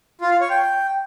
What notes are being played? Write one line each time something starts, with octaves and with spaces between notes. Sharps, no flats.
F4
F5
C#5
G5